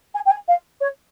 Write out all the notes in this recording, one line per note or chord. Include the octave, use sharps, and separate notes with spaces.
G#5
G5
G#5
F5
C#5